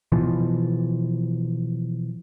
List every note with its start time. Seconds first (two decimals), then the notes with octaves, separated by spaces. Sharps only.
0.12 B2 E3 F3